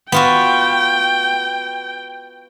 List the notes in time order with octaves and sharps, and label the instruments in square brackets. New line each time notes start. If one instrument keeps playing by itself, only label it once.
[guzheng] B3 F4 F#4 [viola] G5